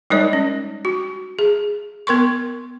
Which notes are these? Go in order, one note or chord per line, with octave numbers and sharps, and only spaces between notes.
G3 G#3 D#4 A#4 C#5 D5
C#4
F#4
G#4
B3 A#4 C6 C#6